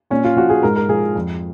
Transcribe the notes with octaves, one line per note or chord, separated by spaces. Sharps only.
A#2 C#4
F4
F3 F#4
G#4
G#2 A#4
A#4
F3 G#4
F2